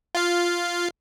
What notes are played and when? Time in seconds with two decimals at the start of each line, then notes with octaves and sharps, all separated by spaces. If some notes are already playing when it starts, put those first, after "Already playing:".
0.15 F4 F5